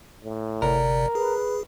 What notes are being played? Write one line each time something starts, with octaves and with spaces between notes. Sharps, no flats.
A2
G1 C3 A#4 D5
G#4 B4